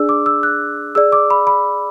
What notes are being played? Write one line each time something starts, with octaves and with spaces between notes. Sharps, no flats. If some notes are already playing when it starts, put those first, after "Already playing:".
Already playing: D4 G#4 D5 E6
D6
E6
F#6
G#4 D5 E6
D6
B5
B5